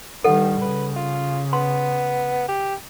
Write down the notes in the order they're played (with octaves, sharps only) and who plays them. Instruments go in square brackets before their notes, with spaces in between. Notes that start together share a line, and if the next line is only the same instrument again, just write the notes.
[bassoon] G2 [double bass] D#3 G3 [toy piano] A4 F#5
[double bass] C#3 [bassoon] B4
[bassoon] F4
[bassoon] B3 [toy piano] C6
[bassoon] G4